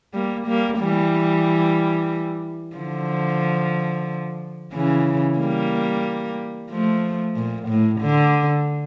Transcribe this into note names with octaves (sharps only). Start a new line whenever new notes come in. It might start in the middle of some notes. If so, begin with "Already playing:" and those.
G3 A#3
G3 A#3
E3 G3
D3 F3
C#3 E3
G3 A#3
F3 A3
A#2
A2
D3